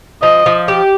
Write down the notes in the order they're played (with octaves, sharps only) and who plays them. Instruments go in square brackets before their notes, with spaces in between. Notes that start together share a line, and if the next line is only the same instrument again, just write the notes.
[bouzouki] F3 [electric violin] D#5
[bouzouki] F3
G4